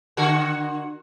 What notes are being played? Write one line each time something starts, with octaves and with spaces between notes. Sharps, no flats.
D3 F#4 A#4